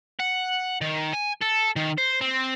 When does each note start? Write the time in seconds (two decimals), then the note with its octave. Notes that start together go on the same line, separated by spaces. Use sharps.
0.20 F#5
0.81 D#3
1.14 G#5
1.42 A4
1.76 D#3
1.98 C5
2.21 C4